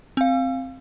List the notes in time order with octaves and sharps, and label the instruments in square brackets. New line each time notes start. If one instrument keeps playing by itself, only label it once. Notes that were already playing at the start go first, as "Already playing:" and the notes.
[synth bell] C4 F5